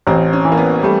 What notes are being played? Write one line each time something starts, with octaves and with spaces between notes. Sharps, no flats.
A1 C4
C#4
E3
A#3
B3
G3 A3